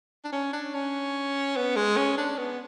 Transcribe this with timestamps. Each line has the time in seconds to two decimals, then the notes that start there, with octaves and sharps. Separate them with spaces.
0.24 D4
0.33 C#4
0.53 D4
0.74 C#4
1.56 B3
1.76 G#3
1.97 C#4
2.18 D4
2.38 B3